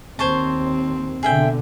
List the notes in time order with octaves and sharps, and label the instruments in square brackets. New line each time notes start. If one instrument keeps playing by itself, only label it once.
[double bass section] D#2 [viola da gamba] C4 [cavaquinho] C5 C#5 A5
[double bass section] B2 D3 [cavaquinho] G#4 E5 G5